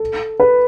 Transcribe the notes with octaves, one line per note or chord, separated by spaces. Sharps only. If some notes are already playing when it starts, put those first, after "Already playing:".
Already playing: A4
B4